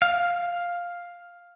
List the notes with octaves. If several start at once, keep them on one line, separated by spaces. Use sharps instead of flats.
F5